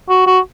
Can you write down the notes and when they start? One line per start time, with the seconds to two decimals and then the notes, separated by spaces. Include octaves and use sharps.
0.09 F#4
0.27 F#4